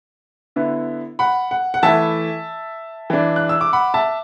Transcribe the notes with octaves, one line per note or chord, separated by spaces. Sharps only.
D3 B3 E4
F#5 B5
F#5
F#5
E3 A3 E4 E5 A5
E3 D4
F#6
E6
D6
F#5 B5
E5 A5